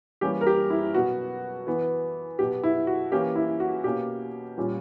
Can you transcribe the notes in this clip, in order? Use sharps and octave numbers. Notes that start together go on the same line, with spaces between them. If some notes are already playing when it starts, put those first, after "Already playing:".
E3 G3 A#3 C#4 G4
A#4
G4
E4
B2 F#3 B3 F#4
E3 B3
B2 F#3 B3 G4
E4
F#4
E3 A#3 C#4 G4
E4
F#4
B2 A#3 C#4 G4
A#2 G3 C#4